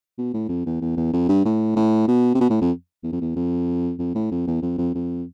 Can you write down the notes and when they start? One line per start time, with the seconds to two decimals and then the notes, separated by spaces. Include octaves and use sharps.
0.18 B2
0.33 A2
0.49 F2
0.66 E2
0.81 E2
0.96 E2
1.13 F2
1.29 G2
1.45 A2
1.76 A2
2.08 B2
2.35 C3
2.41 B2
2.50 A2
2.61 F2
3.03 E2
3.12 F2
3.21 E2
3.36 F2
3.99 F2
4.15 A2
4.31 F2
4.47 E2
4.62 F2
4.78 F2
4.95 F2